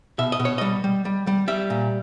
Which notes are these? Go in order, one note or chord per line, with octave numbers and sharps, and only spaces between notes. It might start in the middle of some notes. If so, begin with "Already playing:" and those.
B2 E5
D#5
B2
C#5
G3 D#5
G3
G3
G3
G3 E5
A#2